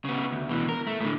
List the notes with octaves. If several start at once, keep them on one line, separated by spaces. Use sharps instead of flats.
C#3 B3
D2
B2 E3
A#4
A3
A2 D3